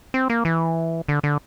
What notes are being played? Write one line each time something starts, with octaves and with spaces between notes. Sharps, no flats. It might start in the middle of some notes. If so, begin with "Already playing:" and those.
C4
A#3
E3
D3
D3